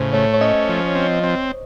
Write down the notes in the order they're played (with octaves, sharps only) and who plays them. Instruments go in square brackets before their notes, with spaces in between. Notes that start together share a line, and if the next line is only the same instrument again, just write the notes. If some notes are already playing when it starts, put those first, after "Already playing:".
Already playing: [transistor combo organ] A2 C#3 [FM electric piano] C5
[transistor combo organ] A3 [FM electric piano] C#5
[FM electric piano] C#5
[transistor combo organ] C#4 [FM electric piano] D#5
[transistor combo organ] F3
C4
C4